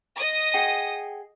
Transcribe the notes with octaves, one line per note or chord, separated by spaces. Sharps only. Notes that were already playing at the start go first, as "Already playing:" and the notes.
D#5 D#6
G#4 F#5 G5